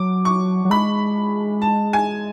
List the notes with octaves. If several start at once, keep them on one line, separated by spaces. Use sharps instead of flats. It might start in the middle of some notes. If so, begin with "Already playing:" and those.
Already playing: F#3 D6
C#6
F#3
G#3 B5
A5
G#5